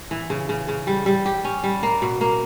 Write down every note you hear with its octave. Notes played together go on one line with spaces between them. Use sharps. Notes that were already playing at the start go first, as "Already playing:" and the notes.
E3
C#3
C#3
C#3
G3
G3
G4
C#4
G3
A#3
B2
A#3